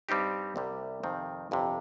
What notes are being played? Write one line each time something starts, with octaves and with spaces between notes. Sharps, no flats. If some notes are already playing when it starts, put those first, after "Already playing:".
G2 G3 C4 D#4 G4
C2 C3 G3
F2 C3 D#3 C4
G1 F2 C3